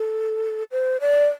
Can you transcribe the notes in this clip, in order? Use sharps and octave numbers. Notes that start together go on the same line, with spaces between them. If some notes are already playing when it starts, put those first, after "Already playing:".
Already playing: A4
C5
D5